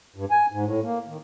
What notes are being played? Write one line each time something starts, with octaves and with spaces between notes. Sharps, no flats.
G2
G#5
G#2
A2
A#3
D#3